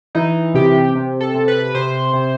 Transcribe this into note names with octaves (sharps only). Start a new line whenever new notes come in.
E3 D#4
C3 G4
C3
A4
C3
B4
C3 C5
C3